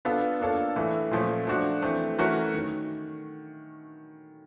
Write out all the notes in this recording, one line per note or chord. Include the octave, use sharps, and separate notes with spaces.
B3 D4 F4 A4
A#3 D4 F4 A4 C#5
A2 E3 A3
A#2 F3 A3 C#4
F3 A3 D4 F#4
E3 A3 C4
E3 A3 C#4 F#4 A#4
D#3